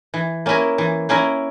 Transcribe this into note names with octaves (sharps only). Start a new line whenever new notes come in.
E3
A#3 C#4 E4 A#4
E3
A#3 C#4 E4 A#4